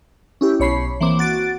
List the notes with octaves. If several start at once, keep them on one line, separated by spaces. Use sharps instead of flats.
C#4 E4 G4
B1 C#5 B5 C7
E3 A#3 C4 D6
F#4 A6 D7